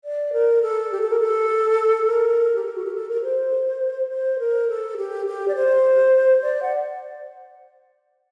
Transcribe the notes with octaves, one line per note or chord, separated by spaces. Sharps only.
D5
A#4
A4
G4
A4
A#4
A4
A#4
G4
A4
F#4
G4
A4
A#4
C5
C5
A#4
A4
G4
G4
D5
C5
D5
F#5